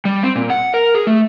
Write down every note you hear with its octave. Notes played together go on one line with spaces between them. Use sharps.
G3
C4
A#2
F#5
A#4
G#4
A3